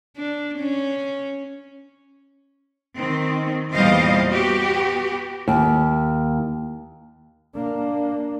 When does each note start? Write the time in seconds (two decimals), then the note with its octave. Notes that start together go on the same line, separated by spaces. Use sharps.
0.17 D4
0.59 C#4
2.97 D#3 C4
3.73 E2 A#2 G3 C5 D#5 F5
4.30 B3 F#4 G4
5.48 D#2
7.55 A#3 D4